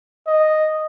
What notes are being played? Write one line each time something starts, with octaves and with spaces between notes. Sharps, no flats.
D#5